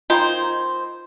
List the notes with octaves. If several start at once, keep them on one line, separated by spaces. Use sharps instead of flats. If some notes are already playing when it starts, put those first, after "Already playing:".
A#3 D#4 F4 C5 D#5 G5 C6